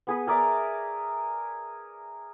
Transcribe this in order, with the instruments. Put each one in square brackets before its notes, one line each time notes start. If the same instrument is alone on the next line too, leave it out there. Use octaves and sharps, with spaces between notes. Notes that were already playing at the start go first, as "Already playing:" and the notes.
[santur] B3 G#4 B4
G#4 A#4 D5 E5